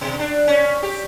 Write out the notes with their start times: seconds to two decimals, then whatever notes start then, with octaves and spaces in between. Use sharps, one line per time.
0.01 B2
0.19 D4
0.48 C#4
0.83 G4